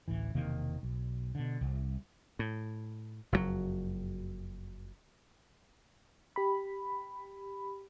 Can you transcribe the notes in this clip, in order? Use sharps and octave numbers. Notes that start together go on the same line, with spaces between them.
D1 A1 E3
E1 C3 D#3 A#3
B1
B2 D3
C2
A2
F#1 F2 C#3 F#3
G4 B5